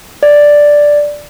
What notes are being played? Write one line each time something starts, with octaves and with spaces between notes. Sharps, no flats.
D5